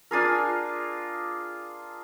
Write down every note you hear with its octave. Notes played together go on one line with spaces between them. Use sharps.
D4 F4 G#4 A#4